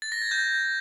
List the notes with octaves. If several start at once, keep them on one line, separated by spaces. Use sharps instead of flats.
A6
A#6
G#6
G6